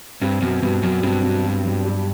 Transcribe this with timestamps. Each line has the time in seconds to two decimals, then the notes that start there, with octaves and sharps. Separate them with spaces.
0.21 G2 C4
0.42 F#2 B2
0.62 G2 B2
0.83 F#2 F#3
1.03 G2 C4
1.24 B2
1.44 B2
1.65 F#3
1.85 G3